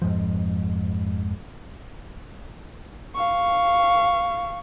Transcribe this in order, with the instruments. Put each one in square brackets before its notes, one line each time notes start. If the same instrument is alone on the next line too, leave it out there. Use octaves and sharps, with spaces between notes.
[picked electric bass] F2 G#2 F3
[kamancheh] F5 C#6